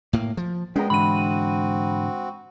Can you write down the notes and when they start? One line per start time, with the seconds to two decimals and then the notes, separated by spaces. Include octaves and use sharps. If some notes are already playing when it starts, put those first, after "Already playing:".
0.13 A2 A#3
0.37 F3
0.76 A#2 G#3 B3 C#4 G#4 G5 A#5
0.90 G#2 D3 E3 C4 F#4 B5 D#7